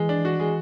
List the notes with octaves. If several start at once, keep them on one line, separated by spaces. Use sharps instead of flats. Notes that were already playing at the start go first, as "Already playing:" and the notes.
Already playing: E3 G#3
D4
F#4
G#3